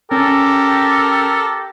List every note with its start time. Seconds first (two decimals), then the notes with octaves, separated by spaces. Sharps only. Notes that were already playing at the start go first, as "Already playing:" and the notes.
0.11 C#4 G4 A4 A#4